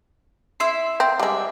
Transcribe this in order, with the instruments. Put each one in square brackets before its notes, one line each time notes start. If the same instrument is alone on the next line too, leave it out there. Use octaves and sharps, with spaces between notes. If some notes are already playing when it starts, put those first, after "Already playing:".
[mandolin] E4 E5 C6
[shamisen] C4
[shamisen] G3 G#3 [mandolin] D5 E5